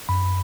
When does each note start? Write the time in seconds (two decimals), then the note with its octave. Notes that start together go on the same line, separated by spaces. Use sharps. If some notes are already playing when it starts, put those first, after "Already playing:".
0.09 F#2 B5